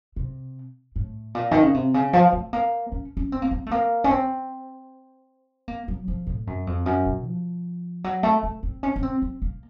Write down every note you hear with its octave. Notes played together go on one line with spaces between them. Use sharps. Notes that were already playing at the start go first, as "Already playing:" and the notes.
C3
A2
A#2
D#3
C#3
C3
C#3
F3
A3
A#3
C#4
C#4
C4
A#3
C4
A3
A#3
C#4
C4
A#3
F#3
F3
A2
F#2
F2
F#2
A#2
F3
F#3
A3
A3
C4
C#4
C#4
C4
C4
A#3